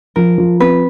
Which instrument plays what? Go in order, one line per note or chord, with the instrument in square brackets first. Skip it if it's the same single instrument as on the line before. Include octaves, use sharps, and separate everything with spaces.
[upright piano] F3 [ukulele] A#4
[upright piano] F3
[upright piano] C4 [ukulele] B4